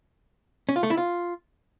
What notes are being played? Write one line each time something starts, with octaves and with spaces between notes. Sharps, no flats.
C#4
F4
A3
E4
F4